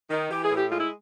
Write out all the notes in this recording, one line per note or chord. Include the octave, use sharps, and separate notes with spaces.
D#3
E3 G4
G#4
A2
G4
G#3 F4
E4